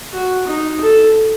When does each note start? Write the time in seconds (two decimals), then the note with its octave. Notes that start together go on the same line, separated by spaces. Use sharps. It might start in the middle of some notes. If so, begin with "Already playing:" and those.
0.13 F#4
0.47 D#4
0.81 A4